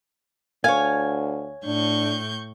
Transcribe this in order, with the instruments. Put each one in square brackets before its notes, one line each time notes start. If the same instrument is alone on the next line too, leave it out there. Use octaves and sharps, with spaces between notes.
[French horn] D2 [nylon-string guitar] C#5 F5 [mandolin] G#5
[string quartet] A2 C#6 G6 [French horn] D4